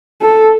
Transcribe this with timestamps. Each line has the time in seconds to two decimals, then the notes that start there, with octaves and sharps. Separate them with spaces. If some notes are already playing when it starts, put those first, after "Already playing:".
0.21 A4